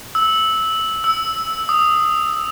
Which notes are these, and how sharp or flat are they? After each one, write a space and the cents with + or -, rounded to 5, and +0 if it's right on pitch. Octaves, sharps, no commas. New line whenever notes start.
E6 -15
E6 -5
D#6 -10